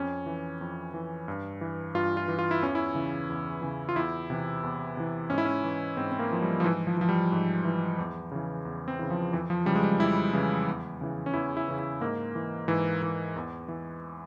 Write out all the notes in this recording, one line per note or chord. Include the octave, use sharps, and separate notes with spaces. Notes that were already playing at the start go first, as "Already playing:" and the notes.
Already playing: F2 C#4
E3
F2
E3
G2
E3
G2 F4
F4
E3
F4
E4
E2 C#4
E4
C#3 E3
E2
C#3 E3
F4
E2 E4
C3 E3
E2
C3 E3
G#2 C#4
E4
C#4
E3
G#2 C4
C4
A#3
E3 F3
G3
F3
G#2 E3
F3
E3 F3
G3
G#2
E3
E2
C#3 E3
E2
C4
C#3 E3
F3
F2 E3
F3
C#3 E3 G3
G#3
G3
F2 E4
C#3 E3
E2
C#3 E3
C#4
E2 E4
E4
C#3 E3 C#4
E4
G#2 A#3
E3
G#2 E3
E3
E2
E3